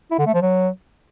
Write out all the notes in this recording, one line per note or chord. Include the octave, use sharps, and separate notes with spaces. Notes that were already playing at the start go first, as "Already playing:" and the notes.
E4
D3
A3
F3
F#3